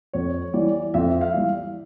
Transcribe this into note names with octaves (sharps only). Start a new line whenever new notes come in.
F2 C#5
E3 G3 D5
F2 E5
F5
E3 G3